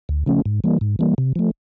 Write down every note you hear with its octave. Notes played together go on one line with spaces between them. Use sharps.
D2
C#3 F3 A3 C#4
G#2
E3 G3 A#3
G#2
E3 G3 A#3
C3
F3 A3